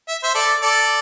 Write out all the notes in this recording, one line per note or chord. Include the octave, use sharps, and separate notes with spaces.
E5
C5 E5
A4 D5
A4 D5